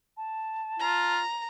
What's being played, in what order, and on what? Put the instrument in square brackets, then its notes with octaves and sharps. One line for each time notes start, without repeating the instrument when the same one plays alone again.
[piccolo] A5
[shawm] F4 [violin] A#5